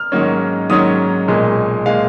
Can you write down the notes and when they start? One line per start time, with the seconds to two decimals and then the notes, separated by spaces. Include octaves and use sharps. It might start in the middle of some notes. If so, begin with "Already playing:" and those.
Already playing: F6
0.12 G#2 D#3 F#3 A#3 C#4
0.69 G#2 D#3 F#3 A#3 C#4 D#6
1.28 B1 A#2 G#3
1.86 A#2 G#3 F5